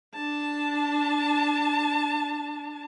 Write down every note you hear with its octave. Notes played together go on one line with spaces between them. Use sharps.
D4 A5